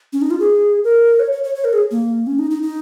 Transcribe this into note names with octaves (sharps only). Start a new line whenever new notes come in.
C#4
D#4
F4
G#4
A#4
C#5
C#5
C#5
C#5
A#4
G#4
A#3
C#4
D#4
D#4
D#4